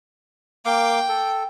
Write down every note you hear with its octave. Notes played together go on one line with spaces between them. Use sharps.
A#3 F5 G5 D6
A4